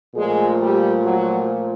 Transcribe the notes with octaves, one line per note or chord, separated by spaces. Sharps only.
A#2 F3 G#3 A3 G#4
G3 G4
F#3 F#4